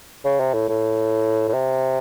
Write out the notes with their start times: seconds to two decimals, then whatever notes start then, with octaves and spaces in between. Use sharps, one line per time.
0.25 C#3
0.40 C3
0.54 A2
0.69 A2
1.48 A2
1.53 C3